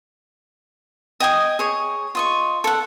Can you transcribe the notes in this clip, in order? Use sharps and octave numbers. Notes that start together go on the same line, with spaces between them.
D#5 G5 G#5 D#6
G#4 C#5
F4 D#5 C#6
A4 F#5